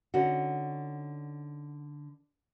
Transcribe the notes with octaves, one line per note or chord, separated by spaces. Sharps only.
D3 C#4 D#4 F#4